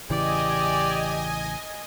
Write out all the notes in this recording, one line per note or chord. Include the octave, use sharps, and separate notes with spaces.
A1 C#3 E3 G4 D5 D#5 G#5